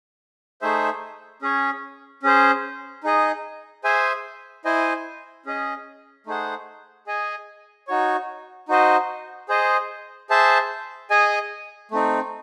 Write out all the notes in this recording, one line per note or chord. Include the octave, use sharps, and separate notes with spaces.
A3 D#4 G#4 C5 E5
C#4 G#4 C#5
C#4 G#4 C5
D#4 G#4 D#5
G#4 C5 E5 G#5
E4 C5 D#5 G#5
C#4 G#4 D#5
A3 D#4 G#4 C5 F#5
G#4 D#5 G#5
D#4 F#4 C#5
D#4 F#4 C5 D#5
G#4 C5 D#5
G#4 C5 E5 A5
G#4 D#5 G#5
A3 C4 D#4